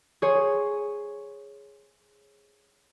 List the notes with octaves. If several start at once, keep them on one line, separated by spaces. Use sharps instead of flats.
G#4 C5 C#5